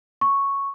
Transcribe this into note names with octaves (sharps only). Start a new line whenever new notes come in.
C#6